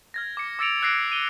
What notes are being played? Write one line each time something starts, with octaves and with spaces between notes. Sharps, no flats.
F6 G#6 A#6
D6 C#7
D6 E6 A6 C#7 D7 F7
E6 F#6 G#6 A#6 C7 D7
D#7 G7